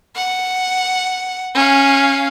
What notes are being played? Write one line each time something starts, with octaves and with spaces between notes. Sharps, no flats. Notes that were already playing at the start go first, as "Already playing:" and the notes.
F#5
C#4 F5